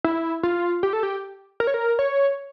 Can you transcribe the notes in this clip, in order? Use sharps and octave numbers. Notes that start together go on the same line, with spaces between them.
E4
F4
G4
A4
G4
A#4
C#5
A#4
C#5